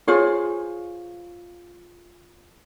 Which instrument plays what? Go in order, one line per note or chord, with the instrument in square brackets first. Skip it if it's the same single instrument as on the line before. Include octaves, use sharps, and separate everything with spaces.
[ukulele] F4 G#4 C5 C#5